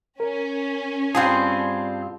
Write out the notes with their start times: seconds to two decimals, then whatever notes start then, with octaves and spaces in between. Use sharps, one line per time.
0.20 C#4 A#4
1.15 G2 G3 C4 F4 G#4 A5